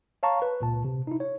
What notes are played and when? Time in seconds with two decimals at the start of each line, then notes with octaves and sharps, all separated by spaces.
0.23 C#5 F5 A5 A#5 C#6
0.42 B4
0.60 C#2 A#2 A5
0.85 C3
1.07 D#4 E4
1.20 C#5